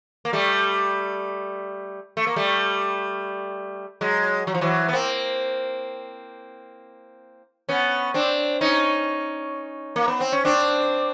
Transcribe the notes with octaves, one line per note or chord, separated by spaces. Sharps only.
A#3
G3 A3
A3
A#3
G3 A3
F#3 G#3
F#3
F3
E3 F#3
B3
A#3 C4
B3 C#4
C4 D4
C#4 D#4
A#3
B3
C4
C#4
C4 D4